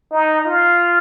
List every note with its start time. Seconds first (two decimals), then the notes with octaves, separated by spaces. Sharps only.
0.11 D#4
0.45 F4